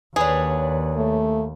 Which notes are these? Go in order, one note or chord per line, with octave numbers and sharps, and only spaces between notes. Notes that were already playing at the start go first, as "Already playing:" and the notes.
D#2 D4 G#4 B4 C#5
A3